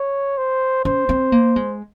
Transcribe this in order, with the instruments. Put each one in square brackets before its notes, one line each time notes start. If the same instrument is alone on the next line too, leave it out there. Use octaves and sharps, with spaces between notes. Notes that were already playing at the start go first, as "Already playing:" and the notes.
Already playing: [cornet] C#5
C5
[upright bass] C#4 [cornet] C5
[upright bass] C4
A#3
G#3